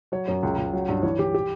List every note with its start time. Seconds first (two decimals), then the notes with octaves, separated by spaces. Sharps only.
0.12 F#3 C#5
0.28 F#2 C#5
0.43 C#2
0.57 C#2
0.73 F#3
0.89 G2
1.03 E3 C#5
1.19 E3 G4
1.34 G4